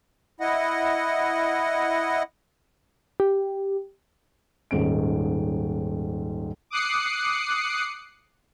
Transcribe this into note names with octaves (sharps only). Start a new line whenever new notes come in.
E4 D#5 F#5
G4
D#1 G#2 C#4 D7
D6 D#6 F#6 C7 C#7